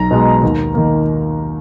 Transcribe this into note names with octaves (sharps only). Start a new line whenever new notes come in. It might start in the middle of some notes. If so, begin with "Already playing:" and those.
Already playing: B1 A#5
B2 G#3
D#2
D#3 A#3